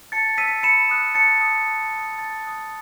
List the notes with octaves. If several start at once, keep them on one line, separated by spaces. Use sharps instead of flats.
A5 A6 C#7
E6 B6 D#7
B5 C#7 E7
D#6 F#6
A5 A6 C#7
D#6 F#6
A5
D#6 F#6
A5 A6
D#6 F#6